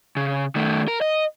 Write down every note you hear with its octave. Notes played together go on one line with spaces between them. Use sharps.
C#3
D#3 A3
A#4
D#5